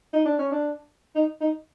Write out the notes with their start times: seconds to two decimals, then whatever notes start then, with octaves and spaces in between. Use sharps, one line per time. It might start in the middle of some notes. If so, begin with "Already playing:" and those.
0.13 D#4
0.25 D4
0.39 C#4
0.52 D4
1.15 D#4
1.41 D#4